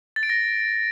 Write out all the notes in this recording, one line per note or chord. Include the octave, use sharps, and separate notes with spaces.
A6
D7
A#6